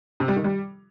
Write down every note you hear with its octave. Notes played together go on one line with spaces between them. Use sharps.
C3
G3
D#3
G3